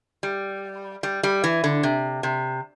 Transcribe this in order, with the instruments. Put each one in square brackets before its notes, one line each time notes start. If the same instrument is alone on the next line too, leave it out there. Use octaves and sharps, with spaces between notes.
[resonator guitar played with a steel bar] G3
G3
G3
E3
D3
C3
C3